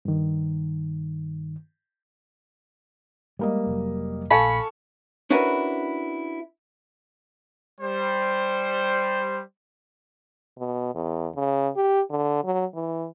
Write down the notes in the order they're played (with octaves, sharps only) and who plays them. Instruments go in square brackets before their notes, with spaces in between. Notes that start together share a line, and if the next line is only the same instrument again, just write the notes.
[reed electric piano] G2 D#3
[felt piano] G3 A#3 D#5 [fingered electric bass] G#3
[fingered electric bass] F1 F#3
[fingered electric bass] A#1 A#2 [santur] A4 F5 G#5 [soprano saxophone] B5 [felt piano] C#6 C#7
[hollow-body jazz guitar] C#4 D4 E4 F#4 A#4 B4
[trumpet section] G3 C5
[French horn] B2
E2
C#3
G4
D3
F#3
E3